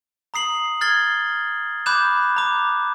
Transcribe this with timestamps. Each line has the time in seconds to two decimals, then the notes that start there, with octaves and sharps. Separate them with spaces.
0.34 A#5 D#6 C7 F#7
0.81 F6 G#6 A6 C7 G7
1.86 B5 D6 F#6 G6 E7
2.36 A#5 D6